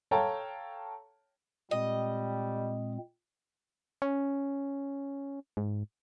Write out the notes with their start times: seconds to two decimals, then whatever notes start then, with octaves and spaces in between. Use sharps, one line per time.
0.11 A4 C#5 F5 G5 A5 A#5
1.71 A#2 G3 G#3 C4 D#5
4.02 C#4
5.57 G#2